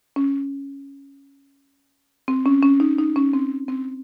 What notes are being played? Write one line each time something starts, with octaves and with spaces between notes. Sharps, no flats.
C#4
C4
C#4
C#4
D#4
D#4
C#4
C4
C4